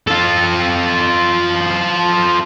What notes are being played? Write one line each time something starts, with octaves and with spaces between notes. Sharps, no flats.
F4 A4